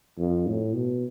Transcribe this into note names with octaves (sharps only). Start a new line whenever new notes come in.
F2
A2
B2